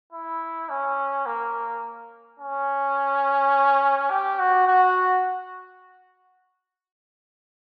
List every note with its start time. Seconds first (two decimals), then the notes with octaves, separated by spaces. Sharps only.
0.12 E4
0.70 C#4
1.26 A#3
2.39 C#4
4.10 G4
4.39 F#4
4.68 F#4